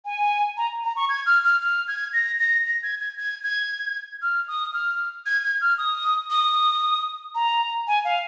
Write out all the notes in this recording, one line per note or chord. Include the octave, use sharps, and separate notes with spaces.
G#5
A#5
A#5
C#6
G#6
F6
F6
F6
G#6
A#6
A#6
A#6
G#6
G#6
G#6
G#6
F6
D#6
F6
G#6
G#6
F6
D#6
D#6
A#5
G#5
F5